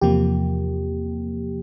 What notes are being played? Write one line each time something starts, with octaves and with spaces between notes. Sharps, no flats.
E2 C3 F3 A#3 G4